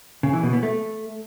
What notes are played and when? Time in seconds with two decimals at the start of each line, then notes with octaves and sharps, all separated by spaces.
0.23 C#3
0.33 E3
0.43 B2
0.53 B3
0.63 A3